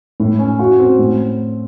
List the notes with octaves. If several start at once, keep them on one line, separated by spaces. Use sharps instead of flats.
A2
C#4
F#4
C4
A2